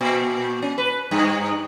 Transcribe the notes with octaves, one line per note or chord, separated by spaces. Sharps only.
A#2
C#4
B4
G2